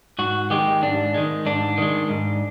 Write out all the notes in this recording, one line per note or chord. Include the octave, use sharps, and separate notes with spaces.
G#2 F#4
D#3 G#3 G4
G#2 D4
D#3 G#3
G#2 D4
D#3 G#3
G#2